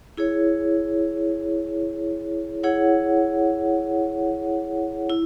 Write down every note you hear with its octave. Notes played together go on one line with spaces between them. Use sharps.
E4 G#4 C#5
E4 G#4 C#5 F#5
E4